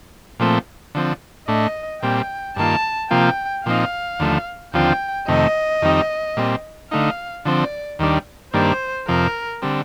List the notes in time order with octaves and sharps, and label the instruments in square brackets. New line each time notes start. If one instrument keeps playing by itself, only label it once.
[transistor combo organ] A#2 F3 A3 C4
D3 F3 C4
[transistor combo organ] A2 A3 D4 [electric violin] D#5
[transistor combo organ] A#2 G3 C4 [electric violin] G5
[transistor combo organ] G2 D#3 A#3 F4 [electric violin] A5
[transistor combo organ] C3 F3 A#3 F4 [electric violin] G5
[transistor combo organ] A#2 F3 C4 D#4 [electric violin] F5
[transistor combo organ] D#2 D3 F3 A3
[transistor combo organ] D#2 D3 F3 C4 F4 [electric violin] G5
[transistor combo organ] F2 C3 D#3 A3 [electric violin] D#5
[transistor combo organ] F2 D#3 G3 C4 D#4
A#2 G3 C4
[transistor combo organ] D3 A3 D#4 [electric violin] F5
[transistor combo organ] D3 F3 C4 [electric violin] D5
[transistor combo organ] D#2 D#3 G3 D4
[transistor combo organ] G2 D#3 G3 A#3 D4 [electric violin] C5
[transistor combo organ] F2 C3 F3 [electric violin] A#4
[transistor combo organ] D3 G3 C4